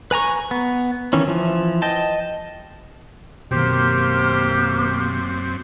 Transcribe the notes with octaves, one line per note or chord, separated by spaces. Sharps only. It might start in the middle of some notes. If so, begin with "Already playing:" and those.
B4 G#5 A#5 C#6
B3
D#3 E3 C#4
E3 F3
D#5 G5 A5
F#2 B2 D#3 A#3 C4 G4 C5 G5